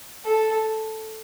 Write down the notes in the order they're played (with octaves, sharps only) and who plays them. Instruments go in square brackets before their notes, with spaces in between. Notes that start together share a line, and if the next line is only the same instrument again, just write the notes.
[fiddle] A4